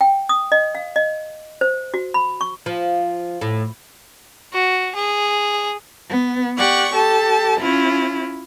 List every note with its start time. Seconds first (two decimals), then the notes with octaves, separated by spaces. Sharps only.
0.01 G5
0.29 D#6
0.52 D#5
0.75 F5
0.96 D#5
1.61 C5
1.94 F#4
2.14 B5
2.41 C#6
2.66 F3
3.41 A2
4.53 F#4
4.95 G#4
6.09 B3
6.58 G4 D5 F#5 C#6
6.94 G4 A4 A5
7.61 C#4 E4 F4